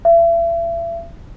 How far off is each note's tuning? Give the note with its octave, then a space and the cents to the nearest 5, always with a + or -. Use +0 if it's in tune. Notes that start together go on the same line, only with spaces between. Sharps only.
E5 +35